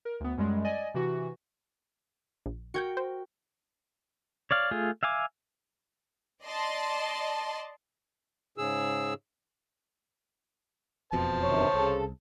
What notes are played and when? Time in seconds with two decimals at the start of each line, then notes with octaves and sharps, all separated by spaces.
0.05 A#4
0.20 D2 B3
0.38 F#2 G3 G#3
0.64 D5 D#5 G#5
0.94 C3 E3 F#4
2.46 A#1
2.74 F#4 A#4 G5 G6 G#6 C#7
2.97 C5
4.51 C#5 D5 F5
4.71 A3 F4 G#4
5.03 E5 F5 G#5 D6
6.44 D5 D#5 A5 C6
8.58 G#2 C#3 G#4 E6
11.13 E1 F2 B2 C5 A5
11.43 G2 C3 D#3 C#5
11.74 C2 C#3 A4